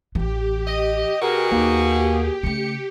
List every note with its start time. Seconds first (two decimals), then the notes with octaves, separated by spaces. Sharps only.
0.15 A1 E3 G4
0.67 D#5
1.21 B2 F#4 G#4 A#4
1.51 D#2 A#3
2.43 C#3 A3 C#7